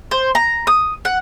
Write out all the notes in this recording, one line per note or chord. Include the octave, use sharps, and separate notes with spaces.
C5
A#5
D#6
F#5